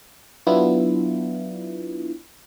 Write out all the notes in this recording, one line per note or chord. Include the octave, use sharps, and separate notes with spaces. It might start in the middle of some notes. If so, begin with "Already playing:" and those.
F#3 B3 D4 E4 F4